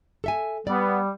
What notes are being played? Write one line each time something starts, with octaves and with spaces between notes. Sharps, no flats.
A4 E5 G#5
G3 B3 D5